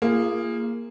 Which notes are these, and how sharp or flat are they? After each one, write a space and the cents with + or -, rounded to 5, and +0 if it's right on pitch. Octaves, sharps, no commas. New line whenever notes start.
A#3 +0 F4 -35 G#4 -15